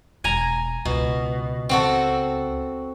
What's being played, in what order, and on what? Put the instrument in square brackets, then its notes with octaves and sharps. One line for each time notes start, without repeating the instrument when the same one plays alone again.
[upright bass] E1 [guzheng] G#5 A#5
[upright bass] C#2 [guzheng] B2
[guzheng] C4 F#4 A4